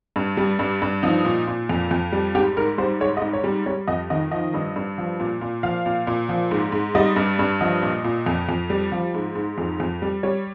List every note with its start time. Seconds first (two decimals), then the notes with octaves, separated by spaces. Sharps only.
0.16 G2
0.37 G3
0.59 G2
0.82 G2
1.03 F3 D#4
1.25 A#2
1.47 A#2
1.69 F2
1.91 F2
2.13 G3
2.35 G#2 G4
2.57 G#2 A#4
2.78 G3 C5
3.01 G#2 C#5
3.17 D#5
3.22 G#2
3.33 C#5
3.44 G3
3.66 G3 C#5
3.88 F2 D#5
4.10 D#3 D#5
4.31 F3 D#5
4.54 G2
4.76 G2
4.98 F3
5.20 A#2
5.41 A#2
5.63 F3 F5
5.86 A#2
6.07 A#2
6.29 F3
6.51 G#2
6.72 G#2
6.95 G3 D#5
7.16 G2
7.39 G2
7.61 F3 D#5
7.82 A#2
8.04 A#2
8.26 F2
8.49 F2
8.70 G3
8.92 F3
9.14 G#2
9.35 G#2
9.58 F2
9.80 F2
10.02 G3
10.23 G3 C#5